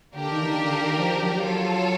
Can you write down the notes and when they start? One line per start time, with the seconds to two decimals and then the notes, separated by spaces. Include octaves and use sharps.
0.14 D3 A#3 D4 G4 A#4
0.30 D#3
0.42 E3
0.46 D#3
0.62 D3
0.78 D#3
0.99 F3
1.21 F#3
1.42 F4 A4 C#5